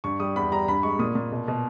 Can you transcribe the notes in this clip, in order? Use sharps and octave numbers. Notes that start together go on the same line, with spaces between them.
G2 C#6
G3 D#6
E2 B5
G3 A#5
G2 B5
G#3 C#6
A#2 D#6
A#2
B2
B2